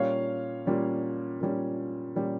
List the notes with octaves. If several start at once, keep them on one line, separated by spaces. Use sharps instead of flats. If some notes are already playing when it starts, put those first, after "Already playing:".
Already playing: A#2 G3 C#4 C#5 F5
A#2 G3 C#4
A#2 G3 C#4
A#2 G3 C#4